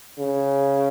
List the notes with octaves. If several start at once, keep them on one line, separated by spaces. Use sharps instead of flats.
C#3